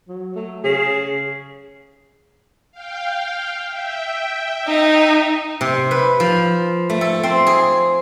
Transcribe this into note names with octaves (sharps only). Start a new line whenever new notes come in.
F#3
F#3 A3
C#3 G#4
F5 G5
E5 G5
D#4
C3
B4
F3
A3
A4
C4
G#4